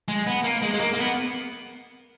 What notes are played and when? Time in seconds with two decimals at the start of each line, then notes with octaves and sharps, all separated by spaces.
0.08 G#3
0.27 B3
0.44 A#3
0.62 G#3
0.74 G#3
0.80 A#3
0.93 A#3
0.98 B3